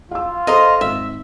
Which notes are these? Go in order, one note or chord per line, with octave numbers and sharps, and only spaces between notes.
F4 F5 E6
A4 C5 D#5 A#5 C6
G#1 E5